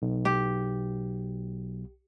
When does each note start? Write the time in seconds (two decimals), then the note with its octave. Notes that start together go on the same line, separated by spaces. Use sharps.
0.02 B1
0.25 G4